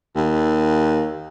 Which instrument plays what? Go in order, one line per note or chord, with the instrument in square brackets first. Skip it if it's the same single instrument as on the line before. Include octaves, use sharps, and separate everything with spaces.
[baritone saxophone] D#2